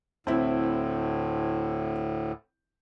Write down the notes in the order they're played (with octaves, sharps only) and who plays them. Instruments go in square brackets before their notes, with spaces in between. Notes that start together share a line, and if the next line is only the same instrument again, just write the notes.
[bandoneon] D2 A2 [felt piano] C4 E4